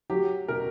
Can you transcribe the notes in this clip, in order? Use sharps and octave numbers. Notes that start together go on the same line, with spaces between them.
F#3 G4
B2 A#4